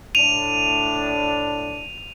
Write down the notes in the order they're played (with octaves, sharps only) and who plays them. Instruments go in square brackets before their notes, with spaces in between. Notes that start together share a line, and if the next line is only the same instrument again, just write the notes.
[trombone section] A2 D4 [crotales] D#7 F7